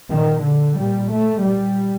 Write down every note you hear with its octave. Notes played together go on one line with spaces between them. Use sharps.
A#2 D#3
D3
A#2 G3
A3
A#2 G3